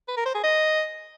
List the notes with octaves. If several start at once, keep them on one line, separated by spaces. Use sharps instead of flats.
B4
A#4
C5
G#4
D#5